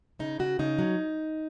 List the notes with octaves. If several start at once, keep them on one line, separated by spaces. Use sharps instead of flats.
C#3 D#4
C#3 F#4
C#3 D#4
F#3